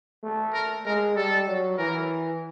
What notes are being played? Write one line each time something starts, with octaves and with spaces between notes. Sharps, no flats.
A3
A#4
G#3 A#4
G3 A4
F#3
E3 A#4